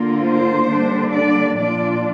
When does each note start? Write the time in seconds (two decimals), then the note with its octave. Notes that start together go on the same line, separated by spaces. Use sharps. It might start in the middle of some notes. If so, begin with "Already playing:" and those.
Already playing: D3 A#3 F4
0.23 C5
0.69 D3 G3 A#3 D4
1.12 D5
1.58 A#2 F3 D4 F4 D5